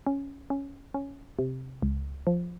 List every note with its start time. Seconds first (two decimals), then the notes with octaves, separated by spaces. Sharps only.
0.07 C#4
0.50 C#4
0.94 C#4
1.39 C3
1.82 C#2
2.27 F3